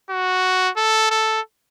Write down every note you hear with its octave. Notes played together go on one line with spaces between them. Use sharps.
F#4
A4
A4